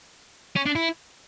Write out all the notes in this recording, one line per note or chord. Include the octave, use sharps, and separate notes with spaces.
C#4
D4
E4